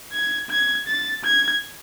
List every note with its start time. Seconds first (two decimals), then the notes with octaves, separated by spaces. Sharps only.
0.13 G#6
0.50 G#6
0.87 A6
1.24 G#6